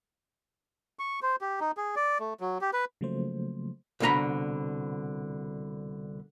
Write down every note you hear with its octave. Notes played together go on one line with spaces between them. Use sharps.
C#6
C5
G4
D#4
G#4
D5
A3
F#3
G4
B4
C#3 F3 F#3 A3 A#3 C5
C2 B2 D3 G#4 A#5 B5